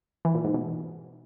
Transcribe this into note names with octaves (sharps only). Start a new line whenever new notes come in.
E3
A#2
G#2
B2